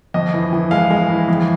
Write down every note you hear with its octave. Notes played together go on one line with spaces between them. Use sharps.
F2 D#5
E3
E3
G#3 F5
G#3
E3
F2